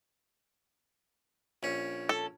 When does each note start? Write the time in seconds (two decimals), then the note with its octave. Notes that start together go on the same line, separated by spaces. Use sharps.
1.63 A#1 C#4
2.09 A4